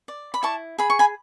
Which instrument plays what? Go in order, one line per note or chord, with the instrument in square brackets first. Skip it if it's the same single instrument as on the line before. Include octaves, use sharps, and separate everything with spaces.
[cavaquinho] D5
B5
E4 A5 C#6
G#4 B5
C#6
G#5 B5